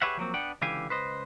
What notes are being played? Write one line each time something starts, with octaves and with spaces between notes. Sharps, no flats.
G4 G#4 B4 C#5 E5 F#5
F3 F#3 A#3 C4
B3 D4 F#5 G5
C#2 D3 E3 G4 F5 G#5
C#2 B4 C5 D#5